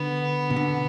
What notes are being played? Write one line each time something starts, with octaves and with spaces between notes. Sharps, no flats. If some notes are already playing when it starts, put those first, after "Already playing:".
Already playing: D3 B3
B2
D3